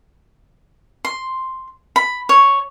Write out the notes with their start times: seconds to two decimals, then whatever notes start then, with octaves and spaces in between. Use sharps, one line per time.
1.05 C6
1.96 B5
2.29 C#5